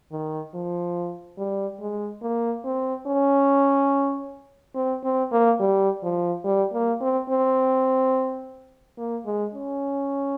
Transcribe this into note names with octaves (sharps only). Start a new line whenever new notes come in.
D#3
F3
G3
G#3
A#3
C4
C#4
C4
C4
A#3
G3
F3
G3
A#3
C4
C4
A#3
G#3
C#4